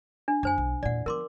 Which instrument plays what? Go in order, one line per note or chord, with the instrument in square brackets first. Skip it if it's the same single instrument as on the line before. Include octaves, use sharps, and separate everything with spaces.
[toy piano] D4
[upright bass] F#2 [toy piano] D4 C5 G#5
[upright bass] B1
[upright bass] E2 A#2 [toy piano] D5 F#5
[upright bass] F3 B3 [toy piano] A#4 C6 D6